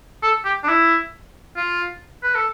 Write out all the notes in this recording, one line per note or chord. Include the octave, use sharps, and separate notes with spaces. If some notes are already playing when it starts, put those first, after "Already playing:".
A4
G4
D4
E4
F4
B4
A4